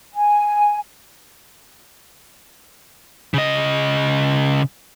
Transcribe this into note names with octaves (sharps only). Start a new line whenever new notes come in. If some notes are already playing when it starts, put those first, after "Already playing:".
G#5
C#3 D#5